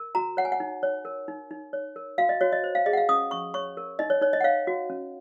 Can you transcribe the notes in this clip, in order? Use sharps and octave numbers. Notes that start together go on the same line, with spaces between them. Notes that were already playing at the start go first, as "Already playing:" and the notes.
Already playing: A#4
F#4 A#5
C#5 F#5
G#5
F#5
D#4
C#5
A#4
D#4
D#4
C#5
A#4
F#4 F5
D#5
F#4 C#5
D#5
C5
F5
G#4 D#5
F#5
F5
C#4 D#6
C#4 C#6
C#5 C#6
A#4
D#4 D#5
C#5
D#4 C#5
D#5
F#5
C#5 F5
F#4
C#4